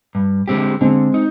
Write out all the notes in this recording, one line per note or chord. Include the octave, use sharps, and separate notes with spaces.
G2
D3 G#3 C4 G4
D3 G#3 C4
D#4